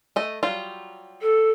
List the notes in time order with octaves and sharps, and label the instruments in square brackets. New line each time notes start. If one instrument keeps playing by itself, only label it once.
[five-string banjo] A3 D#5
F#3 G3 F4
[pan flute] A4